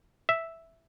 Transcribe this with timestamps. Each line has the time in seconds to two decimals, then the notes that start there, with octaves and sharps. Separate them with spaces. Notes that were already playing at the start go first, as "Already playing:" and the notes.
0.29 E5